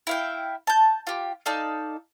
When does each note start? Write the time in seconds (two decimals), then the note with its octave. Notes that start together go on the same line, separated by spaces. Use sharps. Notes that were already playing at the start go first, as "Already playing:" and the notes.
0.07 E4 F5 G5
0.67 A5 G6
1.07 F4 G4
1.46 D#4 A4 D5 F5